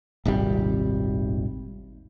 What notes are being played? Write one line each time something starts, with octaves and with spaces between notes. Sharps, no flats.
D#1 G#1 C3 G3